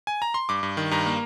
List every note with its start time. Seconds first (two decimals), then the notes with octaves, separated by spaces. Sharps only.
0.07 G#5
0.22 A#5
0.34 C6
0.49 G2 D6
0.63 G2
0.77 D#3
0.91 G2 A#5
1.06 A#3